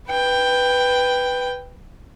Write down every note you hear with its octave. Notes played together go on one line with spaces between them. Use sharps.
B4 G5